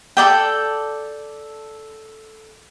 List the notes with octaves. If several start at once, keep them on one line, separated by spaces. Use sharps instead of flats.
A4 D5 G5